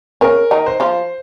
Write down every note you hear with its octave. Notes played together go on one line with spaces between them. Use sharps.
C#3 C#4 A#4
D#3 D#4
C5
F3 F4